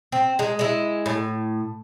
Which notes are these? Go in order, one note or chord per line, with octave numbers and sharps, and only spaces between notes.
C4
G#3
G#3 E4
A2